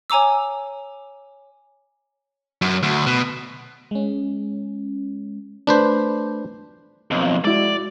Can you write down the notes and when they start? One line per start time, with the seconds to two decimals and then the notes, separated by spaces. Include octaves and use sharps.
0.10 C#5 G#5 A#5 D6 E6
2.62 F#2
2.83 D2
3.06 B2
3.91 G#3 C#4
5.67 A3 D4 B4 C5
7.11 B1 F2
7.45 G#3 E4 F#4 D5